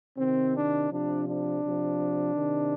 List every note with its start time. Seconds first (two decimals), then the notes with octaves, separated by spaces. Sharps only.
0.17 C3 D#3 C4
0.55 D4
0.91 C3 F3 D4
1.27 D4
1.63 C3 F3
2.36 C3 D#3